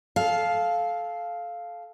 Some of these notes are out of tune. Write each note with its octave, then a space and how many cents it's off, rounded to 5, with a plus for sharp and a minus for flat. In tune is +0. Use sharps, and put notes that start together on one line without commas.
A4 -20 F5 +0